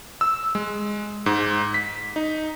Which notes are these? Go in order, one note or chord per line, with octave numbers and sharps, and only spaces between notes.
E6
G#3
G#2
B6
D#4